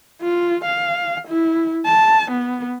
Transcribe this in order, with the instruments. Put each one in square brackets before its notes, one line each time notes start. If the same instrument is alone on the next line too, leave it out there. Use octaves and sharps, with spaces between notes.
[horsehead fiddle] F4
F5
E4
A5
B3